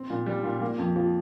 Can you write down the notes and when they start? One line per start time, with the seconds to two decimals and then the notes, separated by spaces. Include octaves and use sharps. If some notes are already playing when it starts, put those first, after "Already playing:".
Already playing: C4
0.10 A#2
0.26 G3
0.44 A#2
0.61 A#3
0.78 F2
0.96 F3